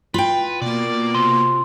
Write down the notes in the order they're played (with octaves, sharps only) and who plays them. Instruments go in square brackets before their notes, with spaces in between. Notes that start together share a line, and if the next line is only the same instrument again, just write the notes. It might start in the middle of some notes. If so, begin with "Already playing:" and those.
[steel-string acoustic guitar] F4 G5 [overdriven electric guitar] B4
[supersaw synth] B2 A#3 [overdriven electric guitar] D5
[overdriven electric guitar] C3 [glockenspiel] C6